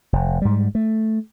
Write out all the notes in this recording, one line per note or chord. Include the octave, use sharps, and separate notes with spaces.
F1
G#2 G3
A3